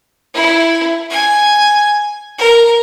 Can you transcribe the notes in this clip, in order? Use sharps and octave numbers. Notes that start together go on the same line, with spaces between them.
E4
G#5
A#4